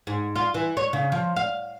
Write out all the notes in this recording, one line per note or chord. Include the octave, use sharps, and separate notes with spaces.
G#2
F4
E3
C#5
C#3
F3
F5